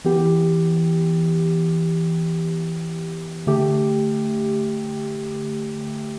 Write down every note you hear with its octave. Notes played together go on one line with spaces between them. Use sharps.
E3 B3 G4
D3 A3 G4